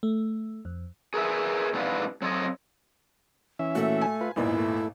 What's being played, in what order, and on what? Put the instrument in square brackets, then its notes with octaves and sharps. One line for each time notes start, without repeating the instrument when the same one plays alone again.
[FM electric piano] A3
F2
[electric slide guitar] G#4 A#4 B4 E5
G#2 C3 E3 D4 B4 F5
F#3 C4 A4 C#5 D#5
[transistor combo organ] E3 C#4 E5
[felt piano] A#2 F#4 [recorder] A3
[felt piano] G#5
[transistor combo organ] F4 B4
[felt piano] G#1 E2 A#2 [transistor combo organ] D#4 [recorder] E4
[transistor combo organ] A3